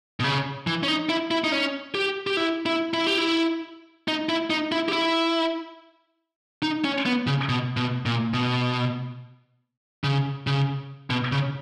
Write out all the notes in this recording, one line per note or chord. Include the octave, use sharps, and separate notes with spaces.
B2
C#3
E3
C#4
D#4
E4
E4
D#4
C#4
G4
G4
E4
E4
E4
G4
E4
D#4
E4
D#4
E4
G4
E4
D#4
C#4
B3
C#3
B2
B2
A#2
B2
C#3
C#3
B2
C#3